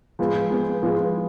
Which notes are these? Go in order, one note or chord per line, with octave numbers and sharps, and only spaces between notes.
F3 G#3 B3
F3 G#3 B3
F3 G#3 B3